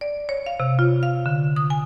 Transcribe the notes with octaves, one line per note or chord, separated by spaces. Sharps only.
D5
C#5
F5
C3
F4
F5
D3
D#6
G#5